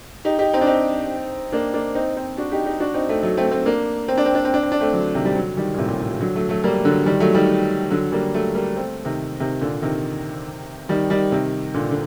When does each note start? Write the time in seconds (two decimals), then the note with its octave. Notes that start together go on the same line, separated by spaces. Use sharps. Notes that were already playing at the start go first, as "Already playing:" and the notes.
0.25 D#4 G4
0.39 D#4 G4
0.53 C4 D#4
0.61 D4
0.67 C4 D#4
1.52 A#3 D4
1.74 A#3 D4
1.95 C4 D#4
2.16 C4 D#4
2.37 D4 F#4
2.52 D#4 G4
2.66 D#4 G4
2.80 D4 F#4
2.94 C4 D#4
3.09 A3 C4
3.23 F#3 A3
3.37 A3 C4
3.51 A3 C4
3.65 A#3 D4
4.08 C4
4.17 D4
4.26 C4
4.35 D4
4.45 C4
4.54 D4
4.63 C4
4.72 D4
4.81 A3 C4
4.93 D3 F#3
5.15 C3 D#3
5.25 G3
5.35 D3 F#3
5.57 D#3 G3
5.74 A#2
5.78 A2 C3
5.88 A#2
6.00 A2
6.10 A#2
6.20 D3 F#3
6.35 F#3 A3
6.49 F#3 A3
6.64 G3 A#3
6.85 D3 F#3
7.06 D#3 G3
7.20 F#3 A3
7.34 D#3 G3
7.91 D3 F#3
8.12 G3 A#3
8.34 F#3 A3
8.55 G3 A#3
8.76 A3 C4
9.05 C3 D#3
9.40 C3 D#3
9.61 A#2 D3
9.82 C3 D#3
10.89 D#3 G3
11.10 D#3 G3
11.32 C3 D#3
11.74 A#2 D3
11.91 D3